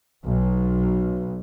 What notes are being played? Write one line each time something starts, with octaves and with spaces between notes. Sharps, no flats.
B1